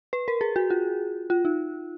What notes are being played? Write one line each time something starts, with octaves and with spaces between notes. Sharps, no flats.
B4
A#4
G#4
F#4
F4
F4
D#4